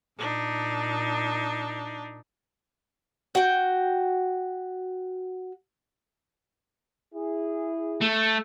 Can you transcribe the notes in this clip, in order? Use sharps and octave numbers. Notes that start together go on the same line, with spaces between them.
A#2 D4 D#4
F#4 G5
E4 G#4
A3